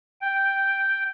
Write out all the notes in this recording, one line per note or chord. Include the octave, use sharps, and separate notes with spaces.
G5